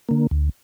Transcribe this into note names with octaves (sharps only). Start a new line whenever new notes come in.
D3 A#3
D2